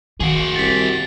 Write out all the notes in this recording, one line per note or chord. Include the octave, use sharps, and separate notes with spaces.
D#3 F#4 G#4 C7 D7
C2 A6 B6